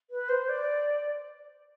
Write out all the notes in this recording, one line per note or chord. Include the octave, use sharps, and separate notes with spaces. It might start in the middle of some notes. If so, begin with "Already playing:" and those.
B4
C5
D5